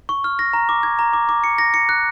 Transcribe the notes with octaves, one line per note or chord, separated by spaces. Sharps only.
C#6
F6
A#6
A#5
D6
G#6
A#5
D6
D6
C#7
A#6
C#7
F#6